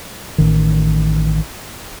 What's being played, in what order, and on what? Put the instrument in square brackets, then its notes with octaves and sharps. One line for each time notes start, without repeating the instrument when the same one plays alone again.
[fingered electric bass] A1 D#3